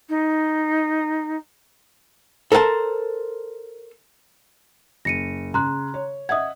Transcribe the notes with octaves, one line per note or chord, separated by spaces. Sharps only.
D#4
A4 A#4 C5 F5 A5
F#1 A#6 C#7 D#7
C#3 A#5 C6 F#6
C#5
D#5 E5 F#5 D#6 G#6